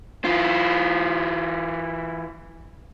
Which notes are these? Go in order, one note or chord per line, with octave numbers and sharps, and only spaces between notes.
E3 F4